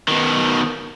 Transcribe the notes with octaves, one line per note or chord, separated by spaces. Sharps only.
B2 D#3